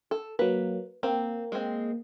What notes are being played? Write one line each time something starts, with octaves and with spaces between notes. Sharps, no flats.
A4
F#3 A#3 B4
A#3 C4
G#3 C4